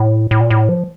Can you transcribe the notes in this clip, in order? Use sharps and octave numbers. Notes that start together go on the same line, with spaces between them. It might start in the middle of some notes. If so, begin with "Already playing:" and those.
Already playing: A2
A2
A#2
A2
F3